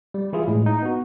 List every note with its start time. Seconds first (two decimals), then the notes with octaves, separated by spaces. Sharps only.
0.14 G3
0.33 E3 E4 F4 G#4
0.48 A2 G#3
0.66 D#4
0.82 B3 F#4